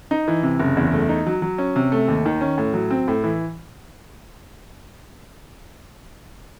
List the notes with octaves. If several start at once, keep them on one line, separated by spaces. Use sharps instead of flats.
D#4
E3
C3
F#1
E2
A3
D#4
F#3
F#3
C#4
C3
A3
D#2
D#3
C#4
A2
F#3
C4
A2
E3